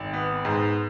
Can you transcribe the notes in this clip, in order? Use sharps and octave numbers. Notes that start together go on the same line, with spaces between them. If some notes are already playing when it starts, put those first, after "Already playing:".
Already playing: G#1
B3
G#2